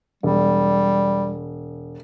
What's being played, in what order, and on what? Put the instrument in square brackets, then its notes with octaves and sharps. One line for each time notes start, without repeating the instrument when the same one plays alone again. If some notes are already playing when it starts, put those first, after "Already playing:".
[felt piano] E1 [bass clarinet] G3